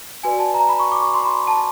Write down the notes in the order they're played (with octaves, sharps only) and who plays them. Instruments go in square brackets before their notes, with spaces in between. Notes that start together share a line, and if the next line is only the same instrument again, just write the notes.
[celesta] F#4 B4 D5 G#5
A5
A#5
B5
C#6
D6
C#6
C6
B5
A5